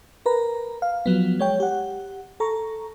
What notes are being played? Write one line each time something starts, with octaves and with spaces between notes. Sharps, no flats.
A#4 B4 A#5
F5
F3 F#3 B3
G#3 C#5 G5
G4 F#5
A4 A#5 C#6